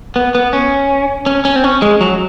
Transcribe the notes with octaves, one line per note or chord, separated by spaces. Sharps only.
B3
B3
C#4
C#4
C#4
C4
C#4
G#3
F#3